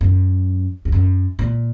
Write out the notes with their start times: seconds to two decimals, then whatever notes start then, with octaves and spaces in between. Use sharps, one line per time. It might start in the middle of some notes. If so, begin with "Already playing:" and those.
0.01 F#2
0.85 E2
0.92 F#2
1.39 A#2